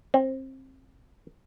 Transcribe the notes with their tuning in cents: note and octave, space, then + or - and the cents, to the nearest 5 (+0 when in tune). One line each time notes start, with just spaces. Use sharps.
C4 +25